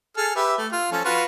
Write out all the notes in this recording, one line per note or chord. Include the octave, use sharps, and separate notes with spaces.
G#4 A4 F6
G4 B4 E5
A3
F4
F3 C#4 A4
F4 F#4 B4